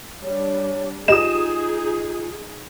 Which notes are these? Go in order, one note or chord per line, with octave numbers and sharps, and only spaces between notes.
G3 D4 C#5
D#4 F4 G4 G#4 D#5 D#6 E7